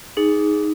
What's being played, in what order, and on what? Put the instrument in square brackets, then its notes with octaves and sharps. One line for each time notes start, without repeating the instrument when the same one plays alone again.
[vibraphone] D#4 [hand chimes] G#4